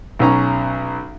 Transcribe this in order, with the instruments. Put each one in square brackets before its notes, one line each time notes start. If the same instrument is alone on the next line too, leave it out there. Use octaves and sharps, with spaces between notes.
[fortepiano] B1 F#3 C#4 A#5